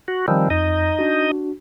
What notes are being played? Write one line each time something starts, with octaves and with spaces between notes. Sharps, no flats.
F#4
D#3 F3 G3 C4 G#5 E6
F2 D#4 D#5
D4 F#4